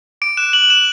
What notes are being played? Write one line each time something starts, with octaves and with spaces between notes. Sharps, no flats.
D6 D7
F#6 E7
D6 F#7
F#6 E7